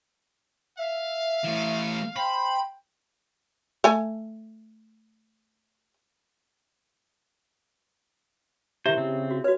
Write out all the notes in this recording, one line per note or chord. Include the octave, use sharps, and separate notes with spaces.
E5 F5
E3 A3
C5 G5 B5
A3 G#5
D#3 E4 G4 C5 E5
C#3 C4
F#4
F#4 B4 C#5